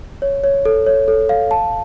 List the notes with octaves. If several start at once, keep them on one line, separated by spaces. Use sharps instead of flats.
C#5
C#5
A4
C#5
A4
F5
A5